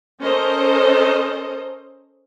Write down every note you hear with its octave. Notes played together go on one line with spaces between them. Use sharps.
C#4 A4 A#4 C5 D#5